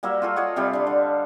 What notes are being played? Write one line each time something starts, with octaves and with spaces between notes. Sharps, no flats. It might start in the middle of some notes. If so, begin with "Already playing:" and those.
G3 A#3 F#4 E5
F4 F#4 A4
F4 C#5 D#5 F#5
C3 G3 F5
G3 D4
D3